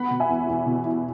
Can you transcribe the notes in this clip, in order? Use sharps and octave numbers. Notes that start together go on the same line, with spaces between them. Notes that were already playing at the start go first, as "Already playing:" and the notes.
Already playing: B3 F#5 B5
B2
E5 G#5
E2
E2
B2
E4